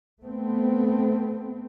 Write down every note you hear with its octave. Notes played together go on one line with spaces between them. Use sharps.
A3 B3 C4